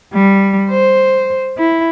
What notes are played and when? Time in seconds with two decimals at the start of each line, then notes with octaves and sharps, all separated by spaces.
0.13 G3
0.70 C5
1.58 E4